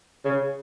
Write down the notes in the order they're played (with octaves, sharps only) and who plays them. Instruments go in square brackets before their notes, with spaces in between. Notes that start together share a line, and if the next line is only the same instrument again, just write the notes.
[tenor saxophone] C#3